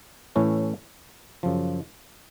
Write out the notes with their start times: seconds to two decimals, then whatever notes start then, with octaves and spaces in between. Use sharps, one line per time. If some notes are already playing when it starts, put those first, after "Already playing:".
0.36 A2 E3 A3 C#4 E4
1.43 F#2 C#3 F3